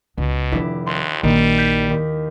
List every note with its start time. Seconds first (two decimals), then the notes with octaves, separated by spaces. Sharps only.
0.18 C#2 B2
0.52 F1 D#3 D4 E4 D5
0.87 D#2 C6 C#6 F#6
1.23 A#1 D#3 G3
1.58 G6 B6
1.90 D#2